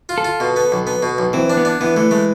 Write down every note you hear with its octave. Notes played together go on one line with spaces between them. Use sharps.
F4
A4
F4
B2
B3
B1
B3
B2
B1
E3 C4
D4
B3
D4
E3 B3
E3 A3
G#3 A3